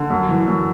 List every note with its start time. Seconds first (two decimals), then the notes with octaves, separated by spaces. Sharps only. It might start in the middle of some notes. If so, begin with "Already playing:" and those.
Already playing: D3
0.10 F#2
0.29 E3
0.48 F#2